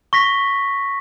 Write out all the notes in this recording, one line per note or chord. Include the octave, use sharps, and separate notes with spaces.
C#6 A#6 B6